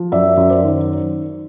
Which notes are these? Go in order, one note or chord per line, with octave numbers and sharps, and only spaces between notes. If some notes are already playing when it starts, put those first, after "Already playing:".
Already playing: F3
F#2 D5 E5
F#2
C5 D5
D#3